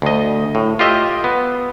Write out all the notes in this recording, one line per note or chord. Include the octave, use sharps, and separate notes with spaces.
D2 D#5
A2
F4 G4 D#5 E5
B3